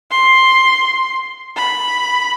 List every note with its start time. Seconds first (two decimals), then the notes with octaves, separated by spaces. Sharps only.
0.11 C6
1.57 B5